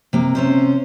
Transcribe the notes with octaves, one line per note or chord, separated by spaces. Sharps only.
C3 A#3
C3 C#4 C5